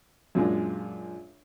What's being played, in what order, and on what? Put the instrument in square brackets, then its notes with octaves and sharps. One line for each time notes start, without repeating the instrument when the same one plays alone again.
[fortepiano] F#2 A#2 G#3 D4